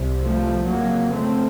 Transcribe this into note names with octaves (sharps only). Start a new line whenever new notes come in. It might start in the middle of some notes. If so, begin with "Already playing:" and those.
Already playing: C2 C3
F3 A3
F2 C#3 F#3 A#3
A3 C4